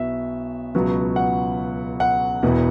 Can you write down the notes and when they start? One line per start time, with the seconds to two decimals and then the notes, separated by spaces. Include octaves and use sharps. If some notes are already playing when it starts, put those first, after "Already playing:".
Already playing: B1 B2 B3 E4 E5
0.75 C#2 B2 F#3 B3
1.16 F#5
2.00 F#5
2.43 E1 E2 E3 B3